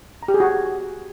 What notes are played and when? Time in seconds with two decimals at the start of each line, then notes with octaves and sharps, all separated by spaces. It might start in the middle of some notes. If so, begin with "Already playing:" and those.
0.23 A#5
0.28 G4
0.34 G#4
0.40 F#4